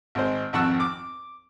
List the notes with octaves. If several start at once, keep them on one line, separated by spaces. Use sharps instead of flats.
G#1 G#3 C5
G#1 F2 F#5 A5 C#6 E6
D6